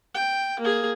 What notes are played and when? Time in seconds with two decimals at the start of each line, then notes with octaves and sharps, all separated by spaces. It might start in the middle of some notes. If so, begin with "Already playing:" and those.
0.15 G5
0.60 A#3 G#4